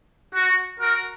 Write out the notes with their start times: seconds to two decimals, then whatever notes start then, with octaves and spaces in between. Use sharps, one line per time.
0.34 F#4
0.80 F#4 A#4